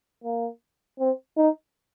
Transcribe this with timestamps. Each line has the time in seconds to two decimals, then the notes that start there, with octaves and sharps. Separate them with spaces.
0.24 A#3
0.99 C4
1.37 D#4